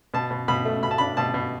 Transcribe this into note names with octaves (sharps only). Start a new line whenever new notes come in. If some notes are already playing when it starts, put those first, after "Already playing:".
B2 A5
B2
B2 B5
A3
B2 B5
A5
D4 B5
B2 A5
B2